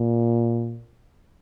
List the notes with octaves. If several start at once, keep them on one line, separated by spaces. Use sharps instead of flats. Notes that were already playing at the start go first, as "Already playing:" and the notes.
Already playing: A#2